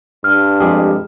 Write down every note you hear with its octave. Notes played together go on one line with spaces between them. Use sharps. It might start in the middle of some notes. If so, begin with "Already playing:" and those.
G2 F6
F2 G#3 G4 G#4